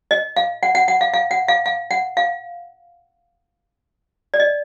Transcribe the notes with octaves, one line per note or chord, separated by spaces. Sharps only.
D#5
F5
F#5
F#5
F#5
F5
F5
F#5
F5
F5
F#5
F5
D5
D#5